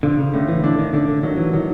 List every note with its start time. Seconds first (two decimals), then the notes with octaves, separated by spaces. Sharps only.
0.03 D3 F3
0.18 C#3
0.34 A2 D3
0.49 E3
0.64 D3 D4
0.79 D#3
0.93 D3 D4
1.08 D3
1.23 D#3 F#3
1.38 E3
1.53 D#3 F#3